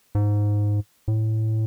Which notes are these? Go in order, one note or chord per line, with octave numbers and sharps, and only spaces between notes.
G#2
A2